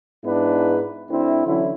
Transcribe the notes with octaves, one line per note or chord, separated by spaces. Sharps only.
G#2 B3 D4 E4 B4
D2 D3 C4 E4
D3 E3 F#3 C#4 E4